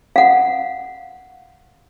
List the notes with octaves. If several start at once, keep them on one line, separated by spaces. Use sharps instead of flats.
F5 F#5